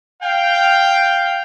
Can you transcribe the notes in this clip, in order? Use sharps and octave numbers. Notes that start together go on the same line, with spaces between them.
F5 G5